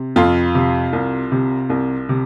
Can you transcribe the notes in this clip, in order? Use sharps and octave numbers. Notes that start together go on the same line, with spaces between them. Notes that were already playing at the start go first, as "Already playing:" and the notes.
Already playing: C3
F2 F4
C3
C2
C3
C2
C3